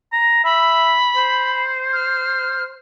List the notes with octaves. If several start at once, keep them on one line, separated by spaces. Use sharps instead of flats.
A#5
E5 B5
C5
F6